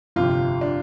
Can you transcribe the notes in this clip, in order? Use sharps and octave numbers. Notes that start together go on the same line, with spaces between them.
G1 F2 C3 F4
D4